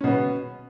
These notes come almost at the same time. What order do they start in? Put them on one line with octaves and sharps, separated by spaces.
C#4 B2 B3